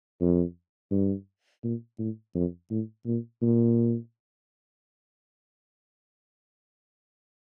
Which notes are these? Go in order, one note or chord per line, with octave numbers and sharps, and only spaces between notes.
F2
G2
A#2
A2
F2
A2
A#2
A#2